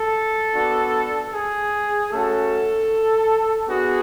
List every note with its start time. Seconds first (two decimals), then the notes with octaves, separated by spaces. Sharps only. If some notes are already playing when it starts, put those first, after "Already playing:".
Already playing: A4
0.54 B3 D4 F#4
1.32 G#4
2.10 A3 C#4 F#4 A4
3.68 B3 D4 F#4 G#4